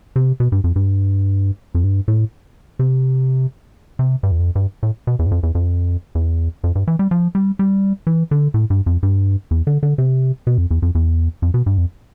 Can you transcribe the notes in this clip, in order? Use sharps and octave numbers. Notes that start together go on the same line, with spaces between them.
C3
B2
G2
F2
G2
F2
G2
A2
C3
C3
G2
E2
F2
G2
A2
B2
E2
G2
F2
E2
F2
E2
F2
G2
E3
G3
F3
G3
G3
E3
D3
A2
G2
F2
G2
E2
D3
D3
C3
B2
F2
E2
F2
E2
F2
B2
G2
F2